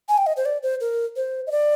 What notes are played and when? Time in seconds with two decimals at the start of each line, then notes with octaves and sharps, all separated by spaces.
0.09 G#5
0.18 G5
0.26 D#5
0.37 C5
0.45 D5
0.63 C5
0.80 A#4
1.16 C5
1.47 D#5
1.51 D5